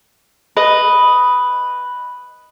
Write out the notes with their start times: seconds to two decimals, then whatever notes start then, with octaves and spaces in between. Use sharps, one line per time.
0.56 B4 D#5